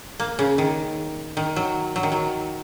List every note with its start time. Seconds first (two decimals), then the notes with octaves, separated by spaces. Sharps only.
0.20 A#3
0.39 C#3
0.58 D#3
1.37 D#3
1.56 F#3
1.96 F#3
2.03 D#3
2.12 F#3